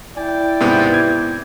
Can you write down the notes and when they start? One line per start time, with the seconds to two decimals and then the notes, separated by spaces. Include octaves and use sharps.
0.17 E4 D5 G5
0.60 G#2 C3 B3
0.94 G#6